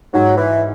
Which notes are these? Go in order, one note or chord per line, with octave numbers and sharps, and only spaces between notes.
G#2 F#3
E3